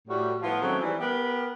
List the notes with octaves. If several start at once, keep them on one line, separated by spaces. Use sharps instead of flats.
A2 G3 F#4
A2 F3 B3 E4 F4
D#3 F#3 G#3 A3 C4 C#4
E3 G3
B3 G4 A#4 B4